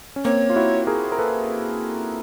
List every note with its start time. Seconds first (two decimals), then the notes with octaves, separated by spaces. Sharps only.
0.16 C#4
0.24 A#3 C4 C#5
0.50 F4
0.56 E4 F#4
0.87 G#4 A#4
1.12 A#4
1.19 A4 B4